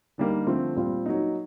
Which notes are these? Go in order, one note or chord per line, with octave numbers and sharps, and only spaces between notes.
D3 G3 A#3 D#4
D3 F3 A3 C4 F4
A#2 G3 C4 F4
F#3 A#3 D#4